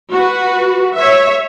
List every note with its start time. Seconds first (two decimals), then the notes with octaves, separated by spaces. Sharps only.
0.12 F#4 B4
0.95 C#5 E5